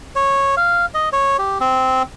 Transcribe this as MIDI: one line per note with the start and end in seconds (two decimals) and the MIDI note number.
0.16 0.55 73
0.57 0.86 77
0.94 1.09 75
1.13 1.37 73
1.38 1.58 67
1.60 2.03 60